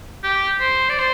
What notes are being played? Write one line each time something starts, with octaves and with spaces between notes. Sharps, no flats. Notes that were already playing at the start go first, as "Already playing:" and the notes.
G4
C5
D5
C5